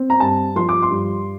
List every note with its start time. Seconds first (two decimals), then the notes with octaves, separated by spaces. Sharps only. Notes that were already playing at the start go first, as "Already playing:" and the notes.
Already playing: C4
0.10 A#5
0.20 G2 A5
0.56 F3 C6
0.69 D6
0.82 C6
0.90 G2